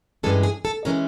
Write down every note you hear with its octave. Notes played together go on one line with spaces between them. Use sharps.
G2 E3 G#3 C#4 A4
G#4
A4
E3 G#3 C#4 A#4